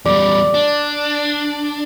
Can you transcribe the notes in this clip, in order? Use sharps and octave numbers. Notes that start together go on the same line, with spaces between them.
E2 G3 D5
D4